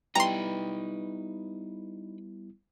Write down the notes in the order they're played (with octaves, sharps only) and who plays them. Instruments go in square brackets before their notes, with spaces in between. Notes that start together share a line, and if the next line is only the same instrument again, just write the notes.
[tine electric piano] G3 B3 E4 [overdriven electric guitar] D#4 B4 [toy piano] G5 [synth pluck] A#5 C6